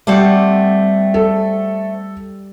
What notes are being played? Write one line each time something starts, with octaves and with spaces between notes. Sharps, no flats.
G3 A3 C4 G4 F#5
A4